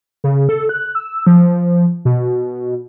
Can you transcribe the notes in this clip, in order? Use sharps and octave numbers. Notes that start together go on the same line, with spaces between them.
C#3
A4
F#6
E6
F3
B2